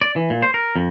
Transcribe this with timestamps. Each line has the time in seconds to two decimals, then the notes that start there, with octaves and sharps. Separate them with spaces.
0.01 D5
0.16 E3
0.30 A#2
0.42 C5
0.54 A#4
0.76 F2